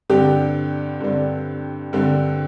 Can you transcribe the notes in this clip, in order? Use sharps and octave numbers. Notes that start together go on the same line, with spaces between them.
G2 D3 G3 C4 G4
G2 D3 G3 C4
G2 D3 G3 C4